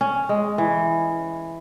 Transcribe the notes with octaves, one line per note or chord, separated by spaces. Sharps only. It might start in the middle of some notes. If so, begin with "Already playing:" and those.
C#4
G#3
E3